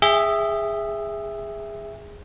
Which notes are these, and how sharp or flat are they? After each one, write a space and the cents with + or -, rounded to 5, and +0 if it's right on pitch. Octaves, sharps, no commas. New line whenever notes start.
G#4 -15 E5 +0 G5 +25